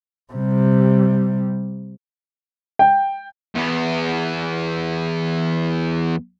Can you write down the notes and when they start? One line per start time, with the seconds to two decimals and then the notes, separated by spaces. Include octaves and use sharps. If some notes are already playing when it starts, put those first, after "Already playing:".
0.33 C3 G3
2.79 G5
3.55 E2 B3